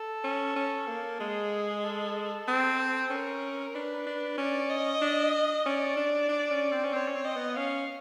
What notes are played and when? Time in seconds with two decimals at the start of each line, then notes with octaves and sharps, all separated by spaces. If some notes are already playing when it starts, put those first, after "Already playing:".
Already playing: A4
0.24 C#4
0.56 C#4
0.87 A#3
1.19 G#3 G#4
1.84 A4
2.48 C4
3.10 C#4 A#4
3.74 D4 B4
4.06 D4
4.38 C#4 D5
4.70 D#5
5.01 D4
5.66 C#4 D5
5.97 D4
6.29 D4
6.51 C#4
6.72 C4
6.84 C#4
6.93 C4 C#5
7.07 C#4
7.15 C4
7.25 D#5
7.36 B3
7.57 C#4 F5